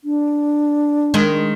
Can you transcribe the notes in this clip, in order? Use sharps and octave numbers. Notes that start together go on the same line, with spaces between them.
D4
D#3 G#3